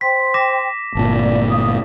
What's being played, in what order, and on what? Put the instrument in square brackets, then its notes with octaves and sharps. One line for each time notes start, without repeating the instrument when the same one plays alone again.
[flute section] C5 G5 C6 [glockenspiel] B6
[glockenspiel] D6 A#6 E7
[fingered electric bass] G1 A#2 [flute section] A5
[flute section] D5
F5 D#6